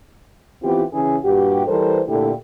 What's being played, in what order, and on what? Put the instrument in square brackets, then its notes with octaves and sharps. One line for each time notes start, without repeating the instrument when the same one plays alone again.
[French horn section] E3 B3 C4 F4 G4
C#3 E3 C#4 G#4
G2 A#2 F#4 G4
E3 G3 A4 A#4 C5
A#2 D3 A3 E4 G4 A4